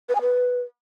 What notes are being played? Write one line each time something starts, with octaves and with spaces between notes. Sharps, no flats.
B4
G#5
B4